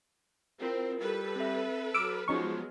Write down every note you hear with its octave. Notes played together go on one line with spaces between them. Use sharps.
C4 E4 F4 A#4
G3 A4 B4
C4 E5
F#3 D6 E6 F6 D7
F3 F#3 G#3 B3 C#4 D#4 C#6